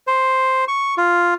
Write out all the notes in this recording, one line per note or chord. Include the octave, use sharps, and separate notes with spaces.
C5
C#6
F4